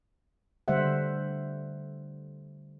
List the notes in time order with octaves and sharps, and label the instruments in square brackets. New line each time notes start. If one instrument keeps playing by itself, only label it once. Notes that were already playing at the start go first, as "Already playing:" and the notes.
[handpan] D3 G3 A3 C5 E5 F#5